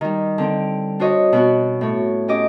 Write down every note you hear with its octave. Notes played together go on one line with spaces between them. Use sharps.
D#3 G3
D3 C4 G5
D4 F#4 C5 C#5 D#5
B2 B3 F#4
A2 C#5
C#4 G4 D#5 D6